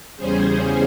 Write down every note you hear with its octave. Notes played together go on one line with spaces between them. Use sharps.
E2 C#3 G3 C#4 G#4 C5